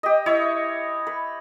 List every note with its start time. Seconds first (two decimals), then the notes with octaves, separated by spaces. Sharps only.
0.03 G4 D#5
0.26 E4 C#5 D#5 E5
1.07 B4